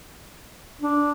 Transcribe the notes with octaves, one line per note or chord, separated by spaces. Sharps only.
D4